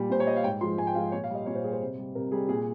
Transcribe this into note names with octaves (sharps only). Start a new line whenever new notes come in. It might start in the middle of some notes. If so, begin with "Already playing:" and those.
Already playing: A#2 G3
A#2 C5
C#5
G3 D#5
F5
G#2 G5
F3 G#3 C6
G#2 G#5
G5
F3 G#3 F5
A#2 C#5
F5
G3 D#5
A#2 C#5
C5
G3 G#4
C5
C3
G3
C3 A#4
G3 G#4
A#2 G#4